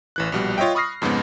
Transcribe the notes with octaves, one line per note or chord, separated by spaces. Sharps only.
A1 E3 F#6
A#1 B2 G3
F4 C#5 D#5 E5 G5
B5 C#6 D#6 F6 A#6 C7
F2 G#2 C#3 G#3 B3